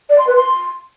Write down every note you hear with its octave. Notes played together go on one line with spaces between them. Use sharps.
D5
C6
B4
C6